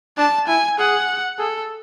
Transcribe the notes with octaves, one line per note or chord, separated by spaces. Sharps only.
D4 A5
E4 G#5
G#4 F#5
G#4 A4